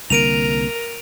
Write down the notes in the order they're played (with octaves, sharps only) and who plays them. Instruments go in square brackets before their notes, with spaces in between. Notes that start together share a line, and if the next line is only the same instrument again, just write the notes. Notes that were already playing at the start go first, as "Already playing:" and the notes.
[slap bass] C2 D3 A#3 [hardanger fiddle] A#4 [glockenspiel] D7 D#7 F7